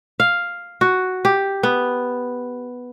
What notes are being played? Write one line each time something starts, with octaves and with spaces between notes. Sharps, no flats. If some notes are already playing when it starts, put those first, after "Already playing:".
F5
F#4
G4
B3